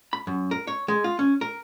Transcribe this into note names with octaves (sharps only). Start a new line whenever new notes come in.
B5
F#2
A#4
C#5
G#3
F4
C#4
A#4